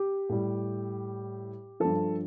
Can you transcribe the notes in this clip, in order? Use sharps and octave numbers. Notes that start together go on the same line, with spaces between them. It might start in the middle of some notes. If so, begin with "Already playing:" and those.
Already playing: G4
A2 G3
G2 F3 A4